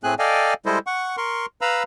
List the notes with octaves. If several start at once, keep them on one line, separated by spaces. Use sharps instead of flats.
A2 A3 C4 G#4 G#5 F#6
A4 D5 D#5 F5 G5 G#5
G3 G#3 E4 A4 C5 D#5
F#5 C#6
A#4 C6 C#6
B4 F5 A#5 B5 E6